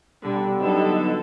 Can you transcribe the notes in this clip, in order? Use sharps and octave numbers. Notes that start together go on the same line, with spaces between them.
B2 D3 G3
D3 F#3 B3 D#4 A4 E6